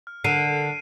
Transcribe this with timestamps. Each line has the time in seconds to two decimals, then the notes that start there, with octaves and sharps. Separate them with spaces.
0.07 F6
0.24 D3 A#4 C7 D7 D#7